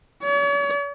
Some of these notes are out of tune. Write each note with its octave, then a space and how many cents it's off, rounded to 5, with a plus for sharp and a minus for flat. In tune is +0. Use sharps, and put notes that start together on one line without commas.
C#5 +45